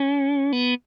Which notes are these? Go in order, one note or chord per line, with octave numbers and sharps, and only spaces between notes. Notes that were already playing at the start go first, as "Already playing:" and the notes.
Already playing: C#4
B3